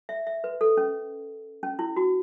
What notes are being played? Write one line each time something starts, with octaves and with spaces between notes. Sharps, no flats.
E5
E5
B4
A4
C#4
C#4
E4
F#4